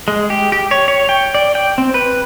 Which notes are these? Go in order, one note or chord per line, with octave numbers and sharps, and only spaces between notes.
G#3
G4
G4
C#5
C#5
G5
D5
G5
C4
B4